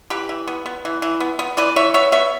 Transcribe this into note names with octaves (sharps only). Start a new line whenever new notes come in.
E3 G4 B4
E3
B3
B3
E3
E3
B3
B3
E3 B4 D5
E3 C#5 E5
B3 C#5 E5
B3 C#5 E5